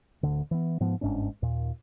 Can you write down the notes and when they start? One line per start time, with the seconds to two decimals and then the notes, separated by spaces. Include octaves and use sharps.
0.23 D1 D2 D3
0.51 E3 B3
0.80 G#2 F3 B3
1.01 G1 G#2 C#4 D4
1.42 D#2 A#2